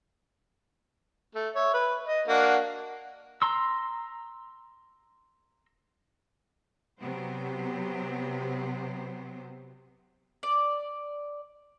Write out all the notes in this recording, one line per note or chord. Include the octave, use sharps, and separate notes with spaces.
A3
C#5 E5
B4
D#5
A#3 D4 F#4
A#5 C6 E6
C3 F#3 B3 C5
D5